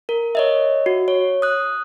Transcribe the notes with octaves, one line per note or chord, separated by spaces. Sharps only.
A#4
C#5 D#5 E5
F#4
C#5
D#6 F#6